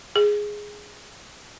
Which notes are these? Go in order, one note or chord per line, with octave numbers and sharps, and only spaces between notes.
G#4